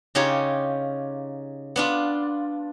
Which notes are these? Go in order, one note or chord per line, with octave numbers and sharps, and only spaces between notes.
C#3 D#4 F4 G4 C#5
B3 D4 F4